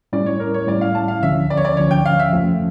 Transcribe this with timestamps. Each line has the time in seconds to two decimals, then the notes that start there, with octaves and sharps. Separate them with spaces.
0.13 A2 G3 C#4 E4 D5
0.26 C#5
0.40 A#4
0.54 C#5
0.67 A2 G3 C#4 E4 D5
0.81 F5
0.95 A5
1.08 F5
1.23 D2 D3 F3 C#4 E5
1.50 D5
1.57 C#5
1.65 D5
1.77 D2 D3 F3 C#4 C#5
1.91 G5
2.05 F5
2.19 E5
2.32 F2 C#3 F3 A3 C#4